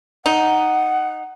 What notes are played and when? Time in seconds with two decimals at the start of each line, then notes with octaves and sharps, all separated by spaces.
0.26 D#4 F#5